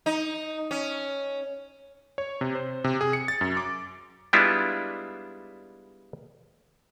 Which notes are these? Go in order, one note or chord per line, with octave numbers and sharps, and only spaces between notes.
D#4
C#4
C#5
C3
C5
C3
G#4
C#7
A6
F#2
D6
G3 G#3 B3 D4 E4 F4